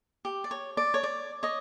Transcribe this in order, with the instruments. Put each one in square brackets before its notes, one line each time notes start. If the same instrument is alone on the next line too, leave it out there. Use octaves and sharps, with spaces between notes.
[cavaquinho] G4
D5
C#5
D5
C#5
D5
C#5 D#5